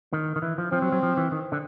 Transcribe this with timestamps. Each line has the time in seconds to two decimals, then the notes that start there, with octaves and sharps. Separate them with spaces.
0.13 D#3
0.36 D#3
0.42 E3
0.58 F3
0.72 F3 C4
0.82 F#3
0.92 F#3
1.03 F3
1.17 E3
1.32 D#3
1.52 D3